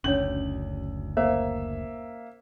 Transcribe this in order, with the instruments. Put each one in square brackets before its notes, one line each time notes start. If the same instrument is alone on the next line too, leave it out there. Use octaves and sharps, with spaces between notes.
[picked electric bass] F#1 D2 [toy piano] C#4 D4 C#5 [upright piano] F#7
[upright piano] A#3 E5 [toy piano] C5